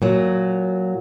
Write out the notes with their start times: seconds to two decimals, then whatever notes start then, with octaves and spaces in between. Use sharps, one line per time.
0.02 A#2 F#3